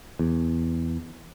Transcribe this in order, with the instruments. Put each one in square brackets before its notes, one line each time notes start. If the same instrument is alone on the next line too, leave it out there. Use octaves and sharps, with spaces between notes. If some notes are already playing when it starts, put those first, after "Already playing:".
[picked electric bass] E2